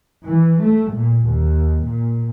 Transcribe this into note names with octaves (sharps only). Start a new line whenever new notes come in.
E3
A3
A#2
D#2
A#2